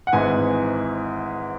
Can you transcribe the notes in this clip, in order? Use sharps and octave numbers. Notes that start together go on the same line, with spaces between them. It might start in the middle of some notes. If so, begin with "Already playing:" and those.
F#5
G#1 G#2 E3 G#5